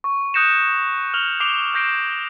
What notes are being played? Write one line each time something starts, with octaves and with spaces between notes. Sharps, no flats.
C#6
D#6 F#6 G6 A#6 C#7 E7
F6 F7 F#7
D6 C7 D7 F7 G7
F6 G6 A#6 C7 D7 E7